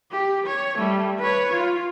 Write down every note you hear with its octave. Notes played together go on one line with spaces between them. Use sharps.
G4
C#5
G3 A3
B4 C#5
F4